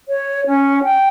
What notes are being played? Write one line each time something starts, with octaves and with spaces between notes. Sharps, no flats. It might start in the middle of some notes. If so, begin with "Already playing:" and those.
C#5
C#4
G5